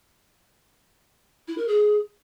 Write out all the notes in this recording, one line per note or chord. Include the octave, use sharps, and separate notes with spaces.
E4
A#4
G#4